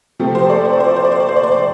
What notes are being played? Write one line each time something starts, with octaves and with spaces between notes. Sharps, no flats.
C3 F3 A3 C4
G4 C5
A4 D5
C5
D5
C5
D5
C5
D5
C5
D5
C5
D5
C5
D5